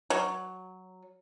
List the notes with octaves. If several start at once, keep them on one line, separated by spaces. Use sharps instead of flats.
F#3